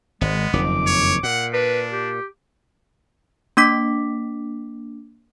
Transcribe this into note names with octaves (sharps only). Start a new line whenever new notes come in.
G#1 G#3 B3
F#1 F2 D#3 D6
C#5
A#2 F#5
D4 B4
G4
A#3 D4 D6 B6